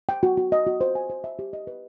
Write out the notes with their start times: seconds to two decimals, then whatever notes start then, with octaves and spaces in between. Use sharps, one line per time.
0.09 G5
0.23 F#4
0.37 F#4
0.52 D#5
0.67 F#4
0.81 C5
0.95 G#5
1.10 C5
1.24 E5
1.39 G4
1.53 D#5
1.67 B4